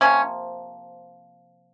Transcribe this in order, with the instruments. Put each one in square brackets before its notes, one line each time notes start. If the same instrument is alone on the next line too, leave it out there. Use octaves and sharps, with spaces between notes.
[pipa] C3 F3 A#3 C#4